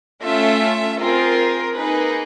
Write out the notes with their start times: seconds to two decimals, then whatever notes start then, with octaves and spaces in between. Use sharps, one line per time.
0.23 A3 C#4 F4 A4 E5
0.99 C4 F4 G#4 A#4
1.76 A#3 D#4 G#4 B4